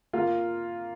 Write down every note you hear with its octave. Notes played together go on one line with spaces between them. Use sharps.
A#3 F4